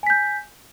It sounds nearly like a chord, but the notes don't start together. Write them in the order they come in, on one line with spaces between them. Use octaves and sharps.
G#5 B6 G6